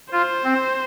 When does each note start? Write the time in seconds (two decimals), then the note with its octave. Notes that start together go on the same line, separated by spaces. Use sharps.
0.12 F4 C5
0.44 C4